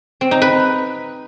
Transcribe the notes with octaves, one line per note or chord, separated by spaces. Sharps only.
C4
D#4
B4